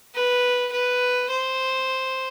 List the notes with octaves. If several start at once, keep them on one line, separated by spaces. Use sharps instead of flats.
B4
B4
C5